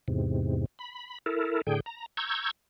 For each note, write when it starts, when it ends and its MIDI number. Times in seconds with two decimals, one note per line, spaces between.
0.08 0.66 40
0.08 0.66 44
0.08 0.66 48
0.79 1.18 83
1.26 1.61 64
1.26 1.61 69
1.26 1.61 70
1.67 1.80 45
1.67 1.80 50
1.67 1.80 68
1.67 1.80 79
1.86 2.06 82
2.17 2.51 82
2.17 2.51 85
2.17 2.51 88
2.17 2.51 91
2.17 2.51 92